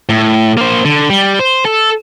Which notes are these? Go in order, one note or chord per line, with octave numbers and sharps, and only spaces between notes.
A2
A#3 C5
D3
G3
C5
A4